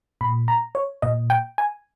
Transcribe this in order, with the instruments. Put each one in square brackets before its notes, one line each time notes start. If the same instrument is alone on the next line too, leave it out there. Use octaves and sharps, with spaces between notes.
[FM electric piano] A#2 B5
A#5
C#5
A#2 D#5
G5
G#5